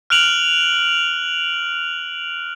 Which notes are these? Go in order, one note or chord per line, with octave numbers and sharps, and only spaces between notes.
F6 F#6 D7 F7 F#7